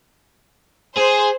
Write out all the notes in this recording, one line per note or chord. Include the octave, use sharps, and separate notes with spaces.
G#4 C5